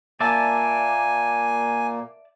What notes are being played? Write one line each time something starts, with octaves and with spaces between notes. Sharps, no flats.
A#2 A#3 D5 E5 G#5 A5